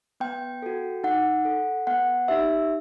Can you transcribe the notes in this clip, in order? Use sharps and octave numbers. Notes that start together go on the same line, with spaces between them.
B3 G5
F#4 A4
D#4 F#5
A4
B3 F#5
D#4 G4 E5